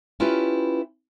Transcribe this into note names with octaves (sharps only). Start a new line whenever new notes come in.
C#4 E4 F4 G4 B4